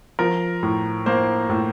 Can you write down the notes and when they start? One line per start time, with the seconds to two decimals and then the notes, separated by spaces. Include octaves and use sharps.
0.19 F3 A#4
0.63 A2
1.06 A#3 C5
1.49 A2